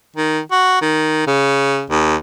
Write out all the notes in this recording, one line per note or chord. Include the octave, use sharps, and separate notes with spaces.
D#3
F#4
D#3
C#3
D#2